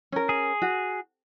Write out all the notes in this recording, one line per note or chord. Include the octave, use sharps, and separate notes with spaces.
C#4 A#4
G#4
F#4